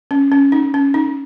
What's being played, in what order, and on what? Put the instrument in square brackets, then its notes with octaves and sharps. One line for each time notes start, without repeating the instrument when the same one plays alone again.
[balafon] C#4
C#4
D#4
C#4
D#4